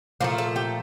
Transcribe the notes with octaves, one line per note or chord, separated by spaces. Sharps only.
A#2 F3 A3 A#3
A4
G4